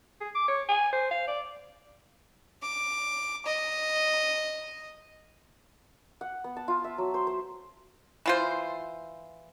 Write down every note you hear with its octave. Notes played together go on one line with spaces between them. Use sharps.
G#4
D6
C#5
G#5
C5
F5
D5
D6
D#5
F#5
B3
A5
F4
E5
F#3
C5
C5
E3 F4 C5